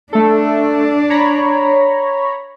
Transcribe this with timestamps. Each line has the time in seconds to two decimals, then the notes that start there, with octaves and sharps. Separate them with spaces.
0.13 A3 D4 A4
1.10 C#5 A#5 B5